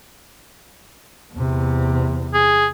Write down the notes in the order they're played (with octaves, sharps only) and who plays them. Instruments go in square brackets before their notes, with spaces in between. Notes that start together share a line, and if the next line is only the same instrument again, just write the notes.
[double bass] E2 C3
[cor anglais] G#4